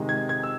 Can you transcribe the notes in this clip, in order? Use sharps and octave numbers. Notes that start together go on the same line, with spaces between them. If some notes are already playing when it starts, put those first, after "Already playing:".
Already playing: C3 D#3 G#3
G#6
G#6
E6